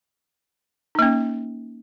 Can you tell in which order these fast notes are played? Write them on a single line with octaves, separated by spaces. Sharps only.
D#4 A#3 C#4